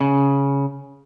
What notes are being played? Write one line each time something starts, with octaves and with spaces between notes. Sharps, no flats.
C#3